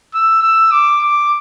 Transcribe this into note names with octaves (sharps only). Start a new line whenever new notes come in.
E6
E6
D6
D6